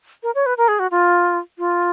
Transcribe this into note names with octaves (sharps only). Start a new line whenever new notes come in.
A#4
C#5
B4
A#4
G#4
F#4
F4
F4